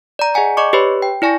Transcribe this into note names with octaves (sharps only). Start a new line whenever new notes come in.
D5 A#5
G#4 D#5 F#5 G#5 A#5
D5 D#5 C#6 D6 C#7
G4 B4 C#5 B5
G5
E4 D5 G#5 C#6 A#6